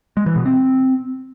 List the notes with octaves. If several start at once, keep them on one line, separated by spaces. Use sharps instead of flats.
G#3
E3
B2
C4